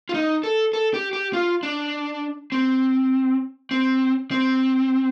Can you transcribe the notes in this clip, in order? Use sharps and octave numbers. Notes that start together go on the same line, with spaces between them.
F4
D#4
A4
A4
G4
G4
F4
D4
C4
C4
C4